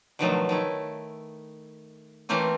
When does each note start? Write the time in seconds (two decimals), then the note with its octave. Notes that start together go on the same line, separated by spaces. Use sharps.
0.19 B2 D3 D#3 F3 F#3 A3
0.49 D#3 A3 E4
2.29 E3 A3 A#3 C4 C#4